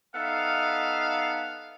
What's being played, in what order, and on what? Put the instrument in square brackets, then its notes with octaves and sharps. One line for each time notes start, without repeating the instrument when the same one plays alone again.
[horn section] B3 D#4 A4 E5 F5